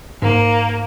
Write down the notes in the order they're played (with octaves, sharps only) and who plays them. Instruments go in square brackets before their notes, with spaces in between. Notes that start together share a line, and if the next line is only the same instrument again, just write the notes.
[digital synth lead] G#2 [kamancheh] A#3